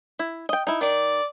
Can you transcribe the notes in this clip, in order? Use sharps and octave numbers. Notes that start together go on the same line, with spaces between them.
E4
D#5 G5
D#4 E4
D#3 D5